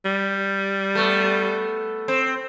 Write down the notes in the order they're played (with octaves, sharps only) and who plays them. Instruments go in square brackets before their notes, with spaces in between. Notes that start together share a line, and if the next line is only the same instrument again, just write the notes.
[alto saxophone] G3
[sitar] A3 B3
C4